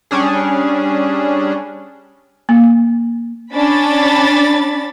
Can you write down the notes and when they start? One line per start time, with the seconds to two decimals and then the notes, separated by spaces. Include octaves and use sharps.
0.11 G3 C#4 D4 G#4
2.49 A#3
3.53 C#4 D4 B5 A6